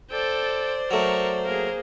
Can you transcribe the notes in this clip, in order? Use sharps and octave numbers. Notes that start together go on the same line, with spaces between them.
A4 C5 D5 G5
F#3 A3 A#4 C#6
A#3 G#4 A#4